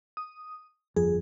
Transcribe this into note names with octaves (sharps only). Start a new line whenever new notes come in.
D#6
G1 F2 G#4